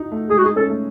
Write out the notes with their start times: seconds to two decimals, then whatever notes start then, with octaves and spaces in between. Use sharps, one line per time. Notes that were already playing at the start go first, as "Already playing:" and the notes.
Already playing: D#4 F#4
0.12 A3
0.29 G#3 G#4
0.38 F#4
0.44 D#4 G#4
0.56 C#4 A4
0.70 A3